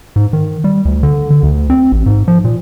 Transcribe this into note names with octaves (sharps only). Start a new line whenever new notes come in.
G#2
D#3
G3
D2
D3
D3
D2
C4
A1
G#2
F3
A#2